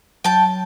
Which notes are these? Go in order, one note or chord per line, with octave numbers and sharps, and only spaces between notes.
F#3 G5 A5